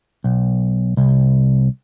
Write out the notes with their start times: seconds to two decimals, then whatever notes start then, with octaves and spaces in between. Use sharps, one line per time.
0.24 B1
0.97 C2